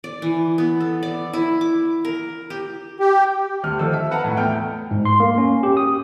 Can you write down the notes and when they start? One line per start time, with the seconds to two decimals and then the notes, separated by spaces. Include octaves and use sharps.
0.04 D5
0.22 E3
0.58 B3
0.80 A4
1.03 D5
1.33 E4
1.61 D6
2.05 A#4
2.50 G4
3.00 G4
3.63 D2 G3 F6
3.79 D#3 F3 A4 E6
3.93 E5
4.11 B4 F#5 A5 A#5
4.24 A2
4.36 E2 A3 G5 F6
4.91 G#2
5.05 C6
5.20 A#3
5.38 C#4
5.63 G4
5.77 D#6